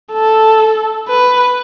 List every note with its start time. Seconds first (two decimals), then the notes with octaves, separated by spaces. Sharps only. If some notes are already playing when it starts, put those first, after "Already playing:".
0.13 A4
1.08 B4